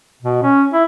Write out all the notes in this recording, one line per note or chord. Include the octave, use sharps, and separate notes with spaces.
B2
C#4
E4